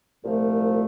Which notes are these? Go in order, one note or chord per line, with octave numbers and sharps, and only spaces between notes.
C2 A#2 F3 A3